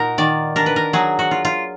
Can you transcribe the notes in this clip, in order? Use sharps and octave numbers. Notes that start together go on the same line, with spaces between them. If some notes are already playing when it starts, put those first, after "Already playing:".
Already playing: A#2 D#4 F#4 A#4
D#3 D5
D4 A#4
B4
A#4
F#3 G#4
F#4
F4
F4